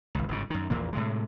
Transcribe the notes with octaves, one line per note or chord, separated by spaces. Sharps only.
G#1 C#2
G1 G#2 C#3
F#2 D#3
A#1 E2 A#2 A#3
A2 C3 G#3